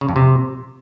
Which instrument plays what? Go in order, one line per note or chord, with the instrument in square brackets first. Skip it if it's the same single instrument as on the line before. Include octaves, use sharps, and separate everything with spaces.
[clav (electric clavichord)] C#3
F2
C3